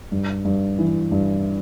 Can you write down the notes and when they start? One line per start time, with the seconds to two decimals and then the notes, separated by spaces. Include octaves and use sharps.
0.12 G2
0.45 G2
0.79 E3
1.12 G2